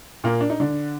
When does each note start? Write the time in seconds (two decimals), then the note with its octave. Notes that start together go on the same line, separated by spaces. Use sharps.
0.24 A#2 A#3
0.41 D4
0.50 D#4
0.60 D3 D4